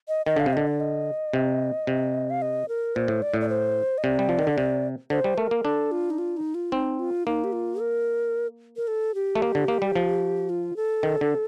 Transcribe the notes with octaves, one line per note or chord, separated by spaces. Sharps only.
D#5
D#3 D#5
D3 F5
C3
D3 D#5
D5
D#5
C3
C3
F5
D#5
A#4
A#2 C5
A2
D5
A2
D5
C5
D#5
C3 D5
G3
F3
D#3
D3
C3
D3 C5
G3
A3 A#4
A#3
D4 A4
F4
D#4
F4
D#4
F4
C4 D#4
F4
A#3 D#4
G4
F4
A#4
A#4
A4
G4
A3
A#3
D3
A#3
G3
F3
F4
A4
D#3
D3